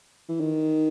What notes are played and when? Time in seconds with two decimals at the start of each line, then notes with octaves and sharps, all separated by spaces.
0.29 E3
0.40 D#3